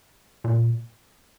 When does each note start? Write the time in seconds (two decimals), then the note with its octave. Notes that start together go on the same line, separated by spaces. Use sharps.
0.44 A#2